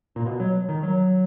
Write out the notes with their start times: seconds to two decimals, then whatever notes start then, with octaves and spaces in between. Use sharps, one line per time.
0.16 A#2
0.26 B2
0.40 F#3
0.69 D#3
0.83 F#3